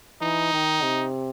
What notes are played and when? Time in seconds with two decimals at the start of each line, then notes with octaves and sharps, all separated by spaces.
0.21 E3 D#4
0.53 D#3
0.82 C3